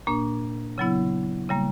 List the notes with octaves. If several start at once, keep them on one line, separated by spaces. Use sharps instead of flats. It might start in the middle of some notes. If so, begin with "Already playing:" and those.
A#2 A#3 D4
C#3 F#3 B3 E4
C#3 G3 A#3